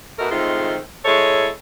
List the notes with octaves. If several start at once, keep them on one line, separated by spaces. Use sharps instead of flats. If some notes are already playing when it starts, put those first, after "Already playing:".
B2 A3 D#4 F#4 A#4
D#3 G#3 A3 C4 F4
G#3 E4 A4 C#5